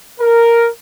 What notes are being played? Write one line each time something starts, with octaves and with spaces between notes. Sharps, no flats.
A#4